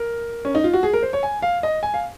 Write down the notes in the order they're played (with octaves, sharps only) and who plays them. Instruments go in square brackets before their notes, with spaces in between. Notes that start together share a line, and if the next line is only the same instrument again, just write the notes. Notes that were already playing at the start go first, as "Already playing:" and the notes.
Already playing: [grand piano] A#4
C#4
D#4
F4
F#4
G#4
A#4
C5
C#5
G#5
F5
D#5
G#5
F5